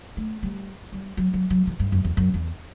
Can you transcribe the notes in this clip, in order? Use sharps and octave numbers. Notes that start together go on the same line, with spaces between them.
A3
G3
G3
F#3
F#3
F#3
E3
G2
F#2
E2
F#2
E2